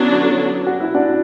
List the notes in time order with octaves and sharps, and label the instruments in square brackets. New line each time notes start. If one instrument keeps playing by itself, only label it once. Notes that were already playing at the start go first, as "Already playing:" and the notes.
Already playing: [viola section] D3 F#3 B3 D4 [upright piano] C#4 E4
[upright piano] F#4
E4
D4 F#4